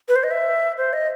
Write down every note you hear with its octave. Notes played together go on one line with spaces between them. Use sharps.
B4
C5
D#5
E5
C5
D#5